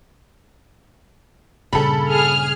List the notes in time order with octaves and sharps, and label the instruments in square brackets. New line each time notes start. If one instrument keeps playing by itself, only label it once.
[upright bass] G2 A#2 [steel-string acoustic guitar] C#3 [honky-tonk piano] A4 B5
[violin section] G#4 F6